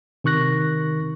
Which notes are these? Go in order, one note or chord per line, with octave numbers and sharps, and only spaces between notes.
C3 D#3 C#6 F#6 A#6